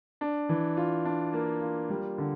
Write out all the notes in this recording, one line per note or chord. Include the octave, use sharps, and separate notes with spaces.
D4
E3
F4
D4
A#3
F4
G3
D3